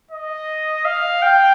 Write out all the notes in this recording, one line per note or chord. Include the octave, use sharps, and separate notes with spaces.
D#5
F5
G5